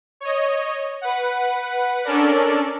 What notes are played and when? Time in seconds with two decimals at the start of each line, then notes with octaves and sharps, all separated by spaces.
0.21 C#5 D#5
1.01 B4 F#5
2.05 C#4 D4 A4 A#4 D5